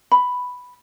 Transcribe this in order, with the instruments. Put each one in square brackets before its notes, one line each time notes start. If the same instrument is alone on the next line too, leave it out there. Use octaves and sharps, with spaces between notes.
[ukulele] B5